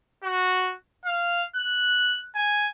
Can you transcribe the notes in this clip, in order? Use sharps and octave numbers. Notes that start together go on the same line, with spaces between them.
F#4
F5
F#6
G#5